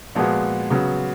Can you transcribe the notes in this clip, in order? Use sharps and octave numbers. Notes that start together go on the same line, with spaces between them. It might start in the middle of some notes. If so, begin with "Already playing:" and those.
A#2 F3 G#3 B3 F#4
C#3 F#3 B3 F#4